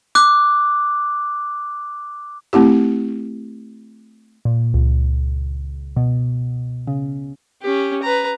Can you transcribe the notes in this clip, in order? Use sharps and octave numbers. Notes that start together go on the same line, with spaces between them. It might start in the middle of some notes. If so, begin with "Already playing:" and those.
D6 F#6
A3 C4 E4 G4
A#2
C#2
B2
C#3
C#4 G4
B4 A#5